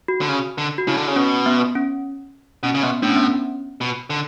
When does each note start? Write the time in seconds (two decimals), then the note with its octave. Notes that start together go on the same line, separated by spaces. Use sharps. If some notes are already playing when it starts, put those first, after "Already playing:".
0.08 F#4
0.21 D3
0.29 C#3
0.58 D3
0.78 F#4
0.88 C#3 E4
0.97 D3
1.07 C#3
1.16 B2 C#4
1.46 B3
1.75 C#4
2.63 B2 C#4
2.74 C#3
2.83 B2 B3
3.02 A2 D4
3.09 C#4
3.16 B3
3.23 C#4
3.81 B2
4.10 D3